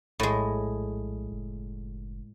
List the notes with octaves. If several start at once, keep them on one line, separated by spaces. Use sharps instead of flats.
A#1 A2 G#3
F#1